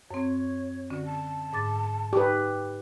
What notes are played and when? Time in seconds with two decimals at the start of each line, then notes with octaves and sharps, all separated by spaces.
0.11 F#2 C4 C#5
0.90 D3 C#4 F#4
1.05 A5
1.53 G#2 D6 A6
2.13 D#4 G4 B4 C#6